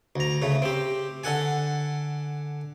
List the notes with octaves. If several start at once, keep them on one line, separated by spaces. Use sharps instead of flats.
D2 A#5
C#3 A3
C4 G4
D3 A4 F#5 G#5